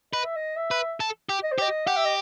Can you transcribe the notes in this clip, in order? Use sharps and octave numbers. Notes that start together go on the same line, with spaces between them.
B4 D#5
E5
D#5
E5
B4
A4
G4
D#5
C5
G4 D#5
G4 F#5
E5
D#5